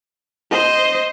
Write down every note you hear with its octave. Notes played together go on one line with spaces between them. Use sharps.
C5 D#5